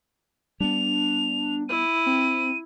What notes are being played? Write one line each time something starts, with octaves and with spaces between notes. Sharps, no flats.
G3 B3 D4 F7
E4 D#7
C4